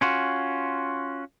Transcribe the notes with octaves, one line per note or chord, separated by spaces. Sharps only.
C#4 F4 F#4